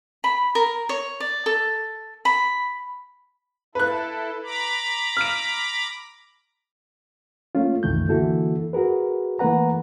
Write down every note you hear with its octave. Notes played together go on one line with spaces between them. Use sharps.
B5
A#4
C#5
D5
A4
B5
E4 A4 B4 F#6
A#5 B5 D6
F6 D7
A3 A#3 C#4 F4
C2 F#2 D#3 E3 A3 G6
D3 E3 A#3 E4 F#4 A4
F#4 G#4 A#4 B4
E3 A3 A#3 B4 F#5 A#5